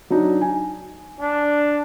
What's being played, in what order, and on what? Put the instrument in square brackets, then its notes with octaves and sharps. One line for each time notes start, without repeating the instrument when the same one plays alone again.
[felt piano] F#3 D4 D#4
G#5
[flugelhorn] D4